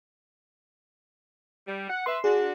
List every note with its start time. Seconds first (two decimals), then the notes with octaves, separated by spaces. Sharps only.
1.67 G3
1.89 F#5
2.06 B4 E5 C6
2.24 D4 F#4 G#4